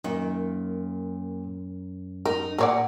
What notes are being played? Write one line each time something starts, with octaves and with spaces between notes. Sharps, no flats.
F#2 A#2 D#3
D#4 A#4
A#2 G#4 A#4 C#5 D5 E5 F#5